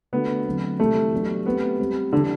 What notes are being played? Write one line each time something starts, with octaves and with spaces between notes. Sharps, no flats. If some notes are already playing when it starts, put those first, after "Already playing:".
D3 A3 B3 D4 F#4 A4
D3 F#3 A3 C4
C3 E3 G3 A3
F#3 B3 D4 G4
A3 B3 C4 G4 B4
G3 C4 G4
D3 E3 G3 D4